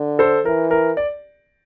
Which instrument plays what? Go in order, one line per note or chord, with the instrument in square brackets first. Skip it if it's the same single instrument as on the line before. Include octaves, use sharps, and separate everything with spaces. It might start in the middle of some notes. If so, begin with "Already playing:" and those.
Already playing: [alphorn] D3
[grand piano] A4 C5
[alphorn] E3 [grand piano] A#4
[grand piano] A#4
D5